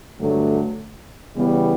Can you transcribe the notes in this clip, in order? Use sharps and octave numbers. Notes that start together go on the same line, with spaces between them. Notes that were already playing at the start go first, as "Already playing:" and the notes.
G2 D3 F#3 A3
C#3 E3 G3 B3